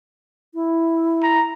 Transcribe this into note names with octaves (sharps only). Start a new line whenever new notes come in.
E4
A#5